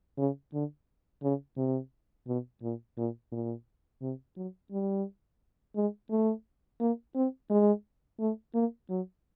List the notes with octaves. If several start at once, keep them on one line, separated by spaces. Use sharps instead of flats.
C#3
D3
C#3
C3
B2
A#2
A#2
A#2
C3
F#3
G3
G#3
A3
A#3
C4
G#3
A3
A#3
F#3